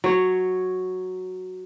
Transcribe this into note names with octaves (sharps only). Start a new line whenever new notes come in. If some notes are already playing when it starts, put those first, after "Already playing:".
F#3 C#5